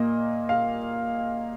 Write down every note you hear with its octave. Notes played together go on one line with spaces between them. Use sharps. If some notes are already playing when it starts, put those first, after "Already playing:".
Already playing: A#2 A#3 D#5
F5